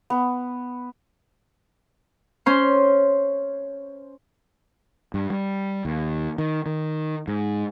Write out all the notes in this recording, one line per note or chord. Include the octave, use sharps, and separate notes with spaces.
B3
C#4 C5 C6
G2
G3
D#2
D#3
D#3
G#2